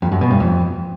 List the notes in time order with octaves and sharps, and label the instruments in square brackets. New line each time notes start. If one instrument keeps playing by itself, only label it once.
[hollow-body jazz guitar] F2
F#2
B2
G2
F2